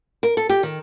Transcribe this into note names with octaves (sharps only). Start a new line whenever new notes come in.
A#4
A4
G4
D#3